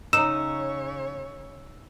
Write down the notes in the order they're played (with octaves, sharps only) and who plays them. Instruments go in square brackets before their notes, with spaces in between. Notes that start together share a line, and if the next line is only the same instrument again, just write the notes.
[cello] C#3 C#5 [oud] D#4 [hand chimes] E6 [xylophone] E7